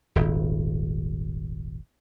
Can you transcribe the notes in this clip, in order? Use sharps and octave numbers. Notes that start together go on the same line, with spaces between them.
D#1 G#1